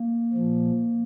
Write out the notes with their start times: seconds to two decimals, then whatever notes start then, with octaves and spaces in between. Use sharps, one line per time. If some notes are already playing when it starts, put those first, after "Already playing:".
Already playing: A#3
0.33 A#2 F3